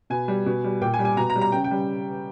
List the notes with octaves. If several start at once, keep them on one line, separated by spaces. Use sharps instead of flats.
B2 G#5
G3
B2
G3
A#2 G5
G#5
G3
G#5
B2 A#5
A#5
G3
A#5
C#3 G5
G5
G3